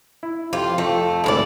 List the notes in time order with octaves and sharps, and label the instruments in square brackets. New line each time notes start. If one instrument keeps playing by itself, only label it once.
[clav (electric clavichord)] E4
[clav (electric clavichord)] F2 [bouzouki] F4 G4
[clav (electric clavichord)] F2 C4 [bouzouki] A3
[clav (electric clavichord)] G#1 D2 G#4 [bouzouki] E4 F4 D5